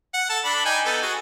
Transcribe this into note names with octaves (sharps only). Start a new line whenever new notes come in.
F#5
A4 A5
D4 B5
D#4 G5 G#5
B3 D#4 A4
F#4 G#4